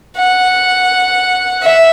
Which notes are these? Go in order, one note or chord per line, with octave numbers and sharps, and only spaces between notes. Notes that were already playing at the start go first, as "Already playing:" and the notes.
F#5
E5